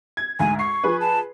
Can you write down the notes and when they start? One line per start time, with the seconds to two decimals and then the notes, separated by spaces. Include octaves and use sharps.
0.17 G#6
0.40 D2 G#2 G#5
0.59 C#6 C7
0.84 F3 G#4 B4
1.00 A5